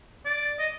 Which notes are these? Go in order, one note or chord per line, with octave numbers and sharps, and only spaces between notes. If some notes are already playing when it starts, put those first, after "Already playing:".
D5
D#5